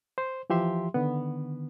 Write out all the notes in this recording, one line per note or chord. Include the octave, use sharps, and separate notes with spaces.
C5
E3 F3 G4 E5 C6
D3 D#3 B3